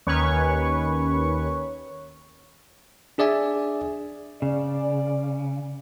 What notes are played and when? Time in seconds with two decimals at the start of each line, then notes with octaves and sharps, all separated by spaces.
0.07 D#2 D#3 C#4 B4 C#5 C#6
3.18 D4 G#4 D5 E5 G#5
4.42 C#3 D5